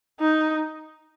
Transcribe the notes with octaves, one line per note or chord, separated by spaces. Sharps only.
D#4